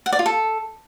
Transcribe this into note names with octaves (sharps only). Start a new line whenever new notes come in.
F#5
D5
F4
A4